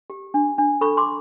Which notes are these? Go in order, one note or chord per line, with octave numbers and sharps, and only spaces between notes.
G4
D4
D4
A4 B5 C#6
C6 D6